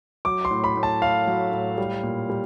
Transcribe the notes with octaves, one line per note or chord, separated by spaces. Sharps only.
F#3 D6
C6
A2
B5
A2
A5
A3 F5
F#3
A2
G3
A#2
G3